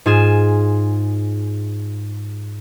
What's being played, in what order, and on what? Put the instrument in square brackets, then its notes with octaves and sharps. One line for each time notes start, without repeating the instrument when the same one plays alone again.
[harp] G#2 F4 G#4 E7